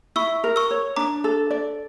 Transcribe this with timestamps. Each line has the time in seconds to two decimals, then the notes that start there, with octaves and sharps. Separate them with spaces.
0.16 E4 C#6 E6
0.44 A#4
0.56 C#6 E6
0.71 C#5
0.96 D4 A#5 D6
1.24 A4
1.50 D5